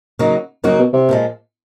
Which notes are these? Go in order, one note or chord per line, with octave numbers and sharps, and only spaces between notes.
C#3 F#3 A#3 D#4 F#4
F#2 C#3 F#3 A#3 D#4 F#4
B2
C3
A#2 F3 G#3